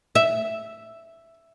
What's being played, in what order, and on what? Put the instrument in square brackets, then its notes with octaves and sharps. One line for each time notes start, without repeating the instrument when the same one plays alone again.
[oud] E5